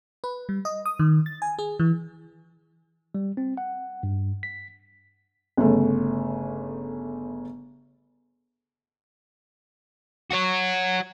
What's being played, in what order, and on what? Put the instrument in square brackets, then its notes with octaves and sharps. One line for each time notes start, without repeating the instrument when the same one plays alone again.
[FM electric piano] B4
G3
D#5
D#6
D#3
A6
G#5
G#4
E3
[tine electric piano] G3
C4
F#5
G2
B6
[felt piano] G1 C#3 A3
[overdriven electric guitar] F#4 C#5